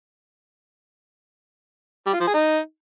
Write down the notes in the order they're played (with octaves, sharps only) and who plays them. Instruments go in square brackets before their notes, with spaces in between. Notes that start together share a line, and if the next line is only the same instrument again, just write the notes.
[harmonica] G3
F4
F3
G#4
D#4